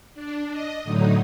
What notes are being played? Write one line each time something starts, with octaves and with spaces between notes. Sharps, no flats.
D4
D#5
A2 D3 F#3 D#4